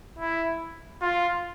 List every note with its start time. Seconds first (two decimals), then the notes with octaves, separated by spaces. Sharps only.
0.19 E4
1.02 F4